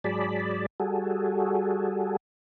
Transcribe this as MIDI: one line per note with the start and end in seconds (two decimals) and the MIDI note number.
0.04 0.66 44
0.04 0.66 54
0.04 0.66 68
0.04 0.66 74
0.04 0.66 81
0.04 0.66 83
0.80 2.16 55
0.80 2.16 66
0.80 2.16 68
0.80 2.16 69